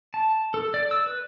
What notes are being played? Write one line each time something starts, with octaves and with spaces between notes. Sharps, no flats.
A5
A4
D5
E6
B4